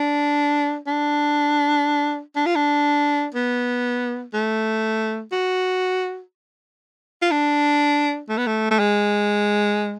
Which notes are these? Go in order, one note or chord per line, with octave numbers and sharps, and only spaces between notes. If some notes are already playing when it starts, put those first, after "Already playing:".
Already playing: D4
D4
D4
F4
D4
B3
A3
F#4
F4
D4
A3
B3
A3
A3
G#3